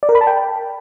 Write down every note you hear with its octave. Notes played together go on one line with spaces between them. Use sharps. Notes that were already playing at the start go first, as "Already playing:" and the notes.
D5
A#4
B5
A5
G5